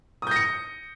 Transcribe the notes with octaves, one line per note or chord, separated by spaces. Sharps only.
D#6 G6 A#6 C#7